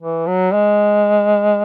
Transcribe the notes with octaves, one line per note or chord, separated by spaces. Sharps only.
E3
F#3
G#3